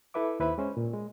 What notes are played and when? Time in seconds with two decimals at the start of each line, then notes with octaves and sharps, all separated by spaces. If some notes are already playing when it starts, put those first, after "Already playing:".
0.14 E4 A4 B4 E5 D6
0.40 D#2 E4 B4 C5 E5 B5
0.58 G#3 C#4 C5
0.77 A#2
0.93 G#3